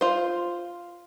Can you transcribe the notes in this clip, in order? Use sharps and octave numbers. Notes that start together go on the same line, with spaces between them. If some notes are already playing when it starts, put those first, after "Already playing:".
F4 C5